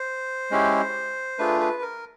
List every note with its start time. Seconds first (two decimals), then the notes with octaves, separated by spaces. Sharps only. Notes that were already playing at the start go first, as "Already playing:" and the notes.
Already playing: C5
0.51 G#3 C#4 E4 G4
1.39 A3 D4 F4 G#4 B4
1.60 B4
1.82 A#4